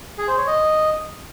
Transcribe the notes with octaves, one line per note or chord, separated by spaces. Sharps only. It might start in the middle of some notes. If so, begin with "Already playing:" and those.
G#4
C5
C#5
D#5